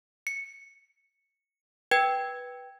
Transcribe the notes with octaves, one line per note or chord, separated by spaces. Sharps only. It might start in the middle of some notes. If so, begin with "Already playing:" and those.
C#7
B4 G5 G#6